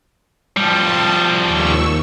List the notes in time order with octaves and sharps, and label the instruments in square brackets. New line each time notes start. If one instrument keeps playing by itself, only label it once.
[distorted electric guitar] F3 G3 [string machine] A5
[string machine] D#2 C#6 E6